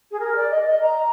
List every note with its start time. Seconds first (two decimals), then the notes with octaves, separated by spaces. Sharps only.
0.12 G#4
0.20 A#4
0.36 D5
0.51 D#5
0.66 D#5
0.82 A#5